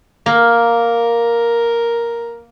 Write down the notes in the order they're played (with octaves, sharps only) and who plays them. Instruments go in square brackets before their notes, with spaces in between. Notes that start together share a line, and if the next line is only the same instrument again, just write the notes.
[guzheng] A#3 [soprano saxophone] A#4